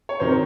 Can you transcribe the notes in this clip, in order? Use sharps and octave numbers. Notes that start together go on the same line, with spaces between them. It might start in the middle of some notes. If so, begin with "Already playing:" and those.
C#5
C3 D#3 F#3 C5